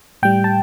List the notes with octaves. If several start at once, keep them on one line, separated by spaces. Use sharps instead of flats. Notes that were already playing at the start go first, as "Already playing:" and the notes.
A2 G3 G5
A5